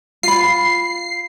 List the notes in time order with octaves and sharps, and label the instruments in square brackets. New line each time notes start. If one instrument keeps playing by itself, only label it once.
[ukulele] F4 B5 [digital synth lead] C7